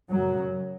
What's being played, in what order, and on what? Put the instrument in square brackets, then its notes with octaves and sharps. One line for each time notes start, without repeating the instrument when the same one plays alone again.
[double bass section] F#2 C#3 F#3